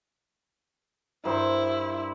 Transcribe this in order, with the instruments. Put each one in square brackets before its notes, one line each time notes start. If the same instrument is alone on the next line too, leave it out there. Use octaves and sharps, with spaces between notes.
[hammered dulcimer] G2 A#4 C5 [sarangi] E4